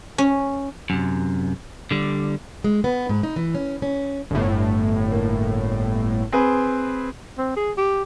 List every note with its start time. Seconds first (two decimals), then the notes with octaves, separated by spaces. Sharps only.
0.18 C#4
0.90 F#2 C3
1.91 D3 G3
2.64 G#3
2.84 B3
3.09 G#2
3.23 D#4
3.36 E3
3.55 C#4
3.82 C#4
4.31 G1 A2
5.12 A#3
6.32 C4 G#4 B4
7.38 C4
7.56 G#4
7.77 G4